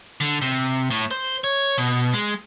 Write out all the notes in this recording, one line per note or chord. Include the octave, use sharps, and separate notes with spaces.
D3
C3
A2
C5
C#5
B2
G#3